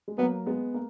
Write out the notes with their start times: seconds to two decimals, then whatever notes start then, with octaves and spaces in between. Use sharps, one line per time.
0.08 G#3
0.18 F#3 A#3 B3
0.46 G#3 B3
0.74 A#3